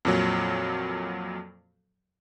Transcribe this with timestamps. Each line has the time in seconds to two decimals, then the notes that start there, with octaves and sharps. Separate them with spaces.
0.05 F2 A#2 F#3